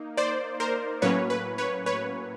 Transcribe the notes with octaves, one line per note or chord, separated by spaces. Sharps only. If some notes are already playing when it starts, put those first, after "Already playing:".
Already playing: A#3 D#4
C5 D5
A#4 C5
A2 F#3 A#3 C#4 B4 C#5
B4
B4 C#5
B4 C#5